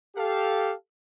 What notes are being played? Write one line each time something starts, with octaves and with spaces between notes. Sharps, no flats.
G4 A4 F5